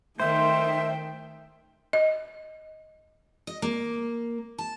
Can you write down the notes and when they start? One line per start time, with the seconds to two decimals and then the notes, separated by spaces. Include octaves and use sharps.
0.20 D#3 A3 C5 E5 G5
1.93 D#5
3.47 D#5
3.62 A#3
4.58 A5